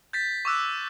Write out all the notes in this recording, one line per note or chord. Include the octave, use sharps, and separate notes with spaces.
G6 A6 B6
C#6 D6 E6 F#6